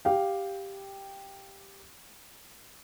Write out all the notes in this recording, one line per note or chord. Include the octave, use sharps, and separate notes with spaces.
G4 F5 G5